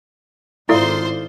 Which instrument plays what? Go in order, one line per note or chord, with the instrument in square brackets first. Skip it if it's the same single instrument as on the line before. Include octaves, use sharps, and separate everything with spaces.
[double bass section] G#1 [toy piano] E4 A4 [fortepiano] F4 D5 E5 [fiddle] C5 C6